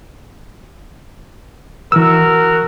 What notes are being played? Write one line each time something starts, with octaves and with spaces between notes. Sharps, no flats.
E3 F#4 A#4 E6